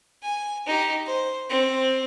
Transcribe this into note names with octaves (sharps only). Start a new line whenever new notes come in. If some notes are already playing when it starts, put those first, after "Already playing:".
G#5
D#4 G4
C5
C4